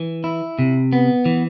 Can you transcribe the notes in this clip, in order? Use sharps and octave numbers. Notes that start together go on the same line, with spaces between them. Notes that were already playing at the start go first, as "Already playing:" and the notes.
Already playing: E3
E4
C3
B3
E3